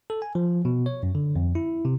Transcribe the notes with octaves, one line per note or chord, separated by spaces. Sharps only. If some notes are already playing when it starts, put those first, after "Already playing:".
A4
G#5
F3
B2
C#5
F#2
D3
F2
E4
C3